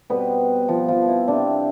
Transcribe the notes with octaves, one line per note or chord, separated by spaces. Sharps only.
B2 G3 B3 C4 B4
F3 F4
F3 F4
E4
C3 G3 C4 D4